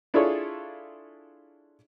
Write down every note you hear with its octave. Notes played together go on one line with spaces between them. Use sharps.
D4 E4 F4 G#4 A4 C#5